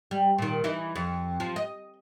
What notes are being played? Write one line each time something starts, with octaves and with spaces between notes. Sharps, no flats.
G3
A#2 D#3
E3 D#4 E4
F2
F3
D#5